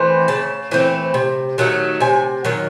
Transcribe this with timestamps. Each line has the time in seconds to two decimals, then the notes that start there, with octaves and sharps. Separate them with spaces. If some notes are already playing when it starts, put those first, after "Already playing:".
Already playing: E3 A3 C4
0.28 C#3 A5
0.71 E3 A3 C4
1.14 C3
1.58 D#3 F#3 A3
2.00 C3 G#5
2.45 D#3 F#3